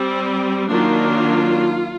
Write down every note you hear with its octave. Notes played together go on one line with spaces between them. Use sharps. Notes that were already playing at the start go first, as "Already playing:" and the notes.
Already playing: G3 C4
D#3 F#3 A#3 D4 F4